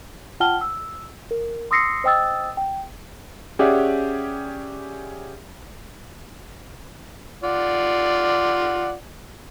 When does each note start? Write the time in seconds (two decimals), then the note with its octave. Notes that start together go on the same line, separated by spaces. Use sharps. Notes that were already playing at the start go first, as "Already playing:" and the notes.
0.40 F4 F#5 G5 A5 F6 G7
0.61 E6
1.31 A#4
1.71 C6 D#6 E6 A#6 C7 C#7
2.04 C5 D#5 G5 D#6 E6 A6
2.57 G5
3.59 C#4 G4 G#4 D5 E5 F#5
7.43 F4 D5 F#5